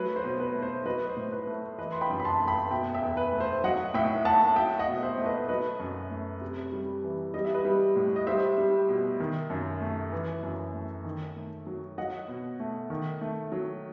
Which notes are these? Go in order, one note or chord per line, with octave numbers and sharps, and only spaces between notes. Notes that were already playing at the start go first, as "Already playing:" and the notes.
Already playing: F#3 A3 B4
C5
B2
B4
A3
C5
F#3 B4 D#5
C5
A2
B4
A3
E3 B4 D#5
C6
G5 B5
F#2
B5
A5 C6
A3
G5 B5
B2 E5 G5
E5 G5
E2
B4
A3
C5
F#3 D#5 F#5
A2 E5 G5
A3 F#5 A5
F#3 E5 G5
D#5 F#5
B2
C5 E5
A3
B4 D#5
F#3 B4 D#5
F#2
A3
C3
G3
E3
G3 D#5
E5
B4 D#5
G3
A2
D#5
G3 C5 E5
G3
B2
D#3
F#2
A3
E3
F#2
A3
D#3
A3
F#3
F#3 D#5 F#5
B2
A3
D#3
A3
F#3